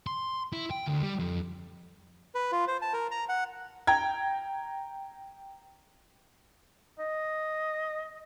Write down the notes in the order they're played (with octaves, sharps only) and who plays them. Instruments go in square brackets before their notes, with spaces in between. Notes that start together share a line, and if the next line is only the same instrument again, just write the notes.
[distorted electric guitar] C6
E4
G5
D2
G3
F2
[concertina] B4
F4
C5
A5
A#4
A#5
F#5
[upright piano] G5 A#5 G#6
[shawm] D#5